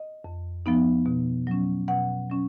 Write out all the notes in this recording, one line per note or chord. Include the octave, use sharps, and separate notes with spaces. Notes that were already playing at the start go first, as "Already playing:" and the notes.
Already playing: D#5
F2
F3 B3 D#4
B2
F#3 C#4
B2 F#5
F#3 C#4